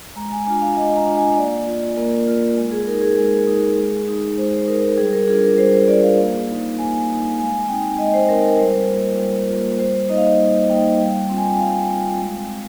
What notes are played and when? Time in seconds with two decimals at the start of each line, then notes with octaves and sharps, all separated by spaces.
0.16 G#3 A#5
0.32 G#5
0.46 D4 F4 G#5
0.62 F5
0.77 G#3 D#5
0.96 A#5
1.06 D4 F4
1.17 G#5
1.37 A#3 D5
1.67 F4
1.96 A#3 A#4
2.28 F4
2.57 G#3
2.72 G#4
2.87 D#4 A#4
3.02 G#4
3.18 G#3
3.47 D#4
3.77 G#3
4.08 D#4
4.38 G#3 C5
4.58 C5
4.68 D#4 A#4
4.98 G3 G#4
5.13 A#4
5.28 D4 F4 G#4
5.43 A#4
5.58 G3 C5
5.73 C5
5.88 D4 F4 D5
6.03 F5
6.18 A#3 F5
6.48 D#4
6.78 A#3 G#5
7.08 D#4
7.38 G#3 G#5
7.69 C4 D#4 G5
7.98 G#3 D#5
8.14 C5
8.29 C4 D#4 A#4
8.48 A#4
8.59 G3 C5
8.89 A#3 F4
9.19 G3
9.49 A#3 F4
9.79 G3 C5
10.09 A#3 D#4 D#5
10.17 F5
10.24 D#5
10.39 G3 F5
10.69 A#3 D#4 G5
11.00 G3
11.29 C4 F4
11.37 G#5
11.49 G5
11.60 G3 F5
11.89 C4 F4
12.20 G#3
12.50 C4